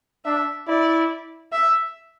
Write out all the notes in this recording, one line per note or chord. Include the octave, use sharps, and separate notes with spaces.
D4 E5
E4 D5
E5